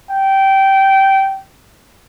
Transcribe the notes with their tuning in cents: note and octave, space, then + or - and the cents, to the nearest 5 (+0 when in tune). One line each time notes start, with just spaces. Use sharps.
G5 -15